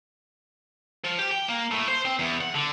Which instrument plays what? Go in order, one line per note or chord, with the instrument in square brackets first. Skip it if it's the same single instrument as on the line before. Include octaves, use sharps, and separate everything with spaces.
[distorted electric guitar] F3
G4
G5
A#3
A2
C5
C4
E2
F#5
D3